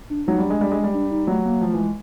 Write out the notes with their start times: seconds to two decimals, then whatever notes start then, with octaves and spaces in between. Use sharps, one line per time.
0.10 D4
0.27 F#3 D#4
0.38 G3
0.45 D4
0.50 G#3
0.61 G3
0.71 G#3
0.84 G3
0.94 D4
1.11 D#4
1.27 F#3 A3
1.45 A#3
1.61 F3 A3
1.73 E3
1.79 G#3